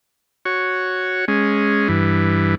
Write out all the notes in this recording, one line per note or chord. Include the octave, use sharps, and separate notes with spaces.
F#4 C#5
G#3 C#4
G2 E3